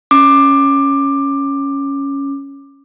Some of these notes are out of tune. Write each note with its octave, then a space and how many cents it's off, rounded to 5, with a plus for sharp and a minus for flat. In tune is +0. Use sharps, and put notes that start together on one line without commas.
C#4 +0 D6 +15